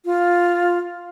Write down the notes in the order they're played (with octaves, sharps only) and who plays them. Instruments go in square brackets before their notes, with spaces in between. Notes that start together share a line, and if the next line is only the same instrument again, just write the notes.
[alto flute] F4